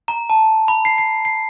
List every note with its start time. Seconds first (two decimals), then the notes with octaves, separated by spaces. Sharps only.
0.08 A#5
0.30 A5
0.68 B5
0.85 C7
0.98 C7
1.25 C7